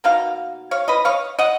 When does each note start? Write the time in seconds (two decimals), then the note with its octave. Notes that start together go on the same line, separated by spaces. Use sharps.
0.04 B2 A#3 D#4 F5
0.71 C#5 F5
0.88 B4 D#5
1.05 C#5 F5
1.39 D#5 F#5